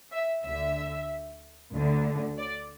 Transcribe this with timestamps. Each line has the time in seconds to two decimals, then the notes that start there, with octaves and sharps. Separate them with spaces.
0.12 E5
0.44 D2 D3 E5
1.72 D2
1.77 D3
2.38 D5